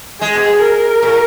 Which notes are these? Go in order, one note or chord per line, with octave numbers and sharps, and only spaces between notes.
G#3 G#4
B2
A#4
A#2